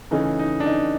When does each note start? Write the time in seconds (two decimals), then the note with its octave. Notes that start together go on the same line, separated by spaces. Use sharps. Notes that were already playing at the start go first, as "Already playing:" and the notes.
0.11 C#3 E3 A3 C#4 D#4
0.39 D#4
0.60 D4
0.66 D#4